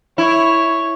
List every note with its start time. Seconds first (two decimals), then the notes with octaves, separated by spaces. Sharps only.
0.18 E4 C#5